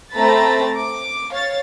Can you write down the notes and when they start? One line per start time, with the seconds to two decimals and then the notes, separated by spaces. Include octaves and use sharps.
0.13 A3 C4 A#5 B5 A6
0.74 D6
1.32 C#5 F5 A6